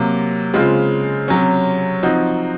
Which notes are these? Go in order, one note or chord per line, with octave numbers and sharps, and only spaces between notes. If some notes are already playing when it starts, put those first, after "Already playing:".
Already playing: C3 F#3 A#3
C#3 G#3 C4 F4
C3 F#3 C#4
F3 C4 D#4 F#4